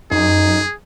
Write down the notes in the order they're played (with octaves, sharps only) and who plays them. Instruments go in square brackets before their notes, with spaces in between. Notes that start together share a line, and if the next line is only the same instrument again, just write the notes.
[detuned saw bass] F#2 [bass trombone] D#4 [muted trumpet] G#4